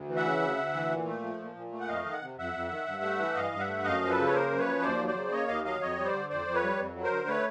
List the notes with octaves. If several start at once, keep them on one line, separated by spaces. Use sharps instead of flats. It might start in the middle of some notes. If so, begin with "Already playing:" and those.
Already playing: D2
E3
E5 F#5
C#3
D2
D2
E3
A#2
A3
F3
A#2
A#2
A3
F#5
F2 D#5 F5
D#3
F#5
C3
F2 E5 F#5
F2
D#3
G2
A3
E3
G2 D#5 F5
G2
E5 F#5
A3
F#2 D#5 F5
F3
A4 B4
C#3
C#5
A#3 A#4 C5
F#2
B4 C#5
F3
D#2 C5 D5
F#3
C5 D5
C#3
A#3 C#5 D#5
D#2 D#5 F5
F#3 D#5 F5
F2 C#5 D#5
G3
C5 D5
D3
F2 C5 D5
F2
B4 C#5
G3
F2
F#3
A#4 C5
D3
A3 B4 C#5